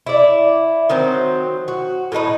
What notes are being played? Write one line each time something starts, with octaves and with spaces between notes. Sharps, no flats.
E4 D5
D#3 F#3 C4 C5
F#4
A2 F#3 D#4 B4